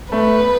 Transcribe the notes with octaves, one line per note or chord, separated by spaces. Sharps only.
A3 B4
B3